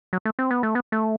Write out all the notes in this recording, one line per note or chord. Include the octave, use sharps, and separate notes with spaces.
F#3
A3
C4
B3
A3
B3
A3